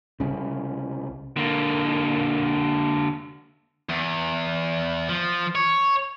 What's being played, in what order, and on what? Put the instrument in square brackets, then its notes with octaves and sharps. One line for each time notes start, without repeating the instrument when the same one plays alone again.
[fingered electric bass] C2 C#3
[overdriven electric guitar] D3 A#3
[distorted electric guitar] E2
F3
C#5